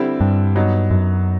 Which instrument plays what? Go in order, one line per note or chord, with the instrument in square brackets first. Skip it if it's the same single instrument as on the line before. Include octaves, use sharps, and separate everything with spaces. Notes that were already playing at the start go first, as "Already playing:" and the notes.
Already playing: [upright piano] D3 G3 C4 E4
[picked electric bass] G2
[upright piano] F#3 B3 D#4
[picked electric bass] F#2